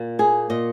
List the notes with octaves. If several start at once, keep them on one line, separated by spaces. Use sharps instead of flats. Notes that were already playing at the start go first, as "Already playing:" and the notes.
Already playing: A#2
A#3 G#4
A#2 D#5